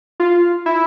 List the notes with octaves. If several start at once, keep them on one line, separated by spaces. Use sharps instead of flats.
F4
E4